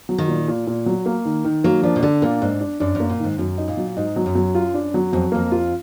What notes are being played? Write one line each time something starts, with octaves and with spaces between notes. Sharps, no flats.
F#3
D#3
A#2
A#2
A#2
F#3
A#3
D#3
D#3
F#3 A#3
F3 D4
B2
D3 D4
A#2 A#3
G#2 D4
D4
F#2 D4
F#2
A#3
A#2
G#2 D#3
F#2 F#3
D#4
A#2
F#3
G#2 D#4
F#3
F#2
F#3
F4
D4
F#3
F2 F#3
F2 A#3
F4